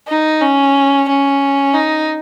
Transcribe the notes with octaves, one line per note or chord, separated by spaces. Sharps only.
D#4
C#4
C#4
D#4